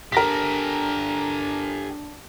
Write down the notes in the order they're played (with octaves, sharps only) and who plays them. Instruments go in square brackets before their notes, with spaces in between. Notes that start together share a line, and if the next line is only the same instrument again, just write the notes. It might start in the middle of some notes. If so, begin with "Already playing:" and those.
[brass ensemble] D4 [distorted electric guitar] G4 A4 [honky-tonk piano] A#4 A#6 B6